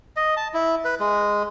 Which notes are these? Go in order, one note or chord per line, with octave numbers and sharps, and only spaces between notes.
D#5
A5
E4
B4
G#3